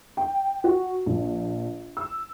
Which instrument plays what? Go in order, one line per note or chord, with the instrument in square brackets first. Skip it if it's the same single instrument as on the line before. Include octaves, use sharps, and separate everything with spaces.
[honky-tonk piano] G5
F#4
A#1
E6